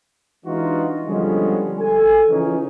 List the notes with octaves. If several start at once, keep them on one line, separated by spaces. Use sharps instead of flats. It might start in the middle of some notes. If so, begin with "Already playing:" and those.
E3 G#3 D4 D#4 F4 F#4
D3 F3 G3 G#3 B3 C#4
A4 G#5
C#3 E3 F3 C#4 D#4